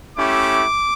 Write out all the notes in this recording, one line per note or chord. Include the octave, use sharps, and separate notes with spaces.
A3 C#4 E4 G4 D6